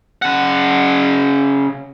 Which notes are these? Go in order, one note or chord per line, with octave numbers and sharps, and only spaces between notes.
C#3 F#5